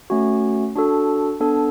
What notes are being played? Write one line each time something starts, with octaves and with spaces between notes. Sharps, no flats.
A3 C#4 F#4
D4 F#4 A4
B3 D4 A4